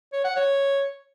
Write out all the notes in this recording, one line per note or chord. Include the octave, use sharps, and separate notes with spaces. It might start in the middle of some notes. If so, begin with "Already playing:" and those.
C#5
F#5
C#5